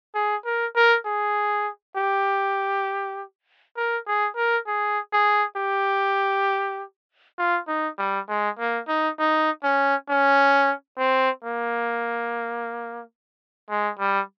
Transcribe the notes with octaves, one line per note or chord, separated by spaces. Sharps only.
G#4
A#4
A#4
G#4
G4
A#4
G#4
A#4
G#4
G#4
G4
F4
D#4
G3
G#3
A#3
D#4
D#4
C#4
C#4
C4
A#3
G#3
G3